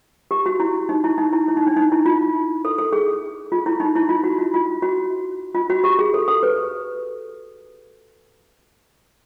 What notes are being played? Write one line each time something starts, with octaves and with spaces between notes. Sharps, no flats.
G4
F#4
E4
D#4
E4
D#4
E4
E4
D#4
D4
D#4
E4
F4
A4
A4
G#4
F4
E4
D#4
E4
F4
F#4
F4
F4
F#4
F4
F#4
G4
G#4
A4
A4
B4